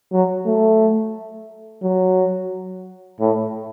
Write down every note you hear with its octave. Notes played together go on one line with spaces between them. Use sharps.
F#3
A3
F#3
A2